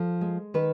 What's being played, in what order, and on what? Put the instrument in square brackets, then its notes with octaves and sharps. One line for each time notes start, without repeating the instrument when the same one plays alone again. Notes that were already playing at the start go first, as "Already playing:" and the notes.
Already playing: [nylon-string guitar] F3 A4
G#3
D#3 B4